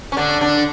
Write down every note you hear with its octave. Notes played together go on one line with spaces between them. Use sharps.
C#4
D3 D4
D3 D4